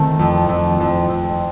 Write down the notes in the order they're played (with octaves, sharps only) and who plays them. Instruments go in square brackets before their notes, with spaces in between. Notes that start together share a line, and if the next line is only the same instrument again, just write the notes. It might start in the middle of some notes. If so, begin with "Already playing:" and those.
Already playing: [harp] D#3 A3 C4 A4
F2
F2
F2
F2